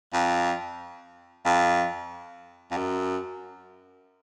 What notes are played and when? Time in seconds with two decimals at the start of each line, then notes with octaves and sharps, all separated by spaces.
0.13 F2
1.46 F2
2.71 F2
2.77 F#2